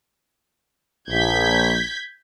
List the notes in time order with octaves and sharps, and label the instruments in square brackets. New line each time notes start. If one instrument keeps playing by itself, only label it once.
[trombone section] A#1 [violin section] G6 G#6 B6